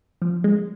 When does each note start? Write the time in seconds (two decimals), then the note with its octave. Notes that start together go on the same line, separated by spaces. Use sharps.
0.22 F3
0.44 G#3